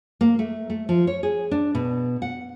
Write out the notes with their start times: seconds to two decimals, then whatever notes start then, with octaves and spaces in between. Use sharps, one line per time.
0.21 A#3
0.39 A3
0.70 A3
0.89 F3
1.07 C#5
1.23 G#4
1.51 D4
1.75 B2
2.22 F#5